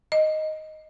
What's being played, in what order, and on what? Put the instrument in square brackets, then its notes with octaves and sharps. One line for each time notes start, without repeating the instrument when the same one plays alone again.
[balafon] D#5